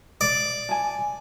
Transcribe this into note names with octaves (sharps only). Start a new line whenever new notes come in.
D5
G#5 A5